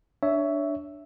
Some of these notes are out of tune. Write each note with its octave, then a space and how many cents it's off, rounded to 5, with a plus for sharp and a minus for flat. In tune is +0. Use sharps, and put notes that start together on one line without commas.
D4 +0 C#5 +20 E5 +0